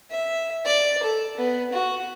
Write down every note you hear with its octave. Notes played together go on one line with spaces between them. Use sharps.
E5
D5
A4
B3
F#4